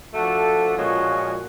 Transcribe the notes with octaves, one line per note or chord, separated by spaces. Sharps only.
F3 A3 D4 F#4 A4
A#2 F3 G#3 C#4 F#4